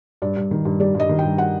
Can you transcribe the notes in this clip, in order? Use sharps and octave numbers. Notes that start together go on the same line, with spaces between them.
G2 D5
G2
D#3
G2
G3 D5
G2 D#5
D#3
G2 G5
F#5